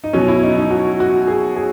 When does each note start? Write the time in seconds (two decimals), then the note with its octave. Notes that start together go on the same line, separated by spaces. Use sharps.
0.04 D#4
0.13 B2 F#3 C#4
0.28 E4
0.43 D#4
0.57 D#4
0.70 F#4
1.00 F#4
1.28 G#4
1.56 G#4